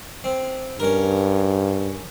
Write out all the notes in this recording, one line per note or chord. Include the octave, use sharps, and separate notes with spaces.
C4
G2 C#4 A#4